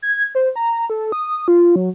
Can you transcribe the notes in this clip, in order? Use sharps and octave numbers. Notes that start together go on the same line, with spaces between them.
G#6
C5
A#5
A4
D#6
F4
F#3